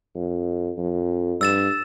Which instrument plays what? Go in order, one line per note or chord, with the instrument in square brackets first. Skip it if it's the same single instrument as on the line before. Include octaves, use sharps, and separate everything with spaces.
[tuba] F2
F2
[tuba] G2 [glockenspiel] E6 A6 E7